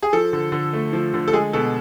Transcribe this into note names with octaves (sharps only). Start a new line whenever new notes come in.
G#4
F3 A4
D3
D3
A3
F3
D3
A4
G#3 G#4
B2 A4